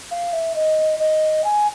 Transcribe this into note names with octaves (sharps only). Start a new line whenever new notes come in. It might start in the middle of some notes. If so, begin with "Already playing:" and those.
F5
E5
D#5
D#5
G#5